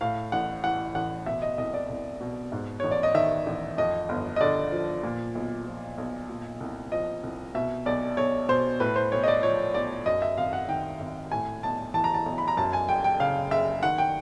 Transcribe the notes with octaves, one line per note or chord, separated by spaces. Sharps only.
A2 F5
A1 F#5
E3 F#5
A1 F#5
B2 E5
D#5
C2 D#5
D5
C2
B2
G#2
A1 C#5
D5
D#5
D#3 E5
A1
F2 D#5
G1
D#5
D3 D5
F3
A#2
B1
F3
B1
A#2
C2
F3 D#5
C2
B2 E5
B1 D5
B1 C#5
B2 C5
A2 B4
C5
B1 C#5
D#5
D5
F3 C#5
B1 D5
F#2 D#5
E5
G#1 F5
F#5
D#3 G5
G#1
A2 G#5
B1 A5
E3 A5
A#5
A5
B1
B5
A#5
F#2 A5
G#5
F#1 G5
G5
C#3 F5
F#1 E5
D#3 F#5
G5